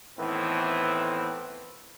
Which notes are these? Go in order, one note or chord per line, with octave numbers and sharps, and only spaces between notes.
A2 D#3 E3 B3 C4